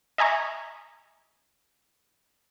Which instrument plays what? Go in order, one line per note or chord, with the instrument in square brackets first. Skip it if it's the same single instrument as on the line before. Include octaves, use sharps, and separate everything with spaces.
[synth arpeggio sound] D#5 E5 G#5 A#5 C#6